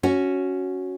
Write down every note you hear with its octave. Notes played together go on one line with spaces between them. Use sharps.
C#4 F#4